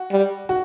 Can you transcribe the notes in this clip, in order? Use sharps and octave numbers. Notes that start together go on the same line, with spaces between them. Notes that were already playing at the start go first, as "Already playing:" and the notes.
Already playing: F#4
G3
F#4